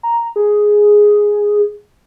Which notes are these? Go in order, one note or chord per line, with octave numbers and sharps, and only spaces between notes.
A#5
G#4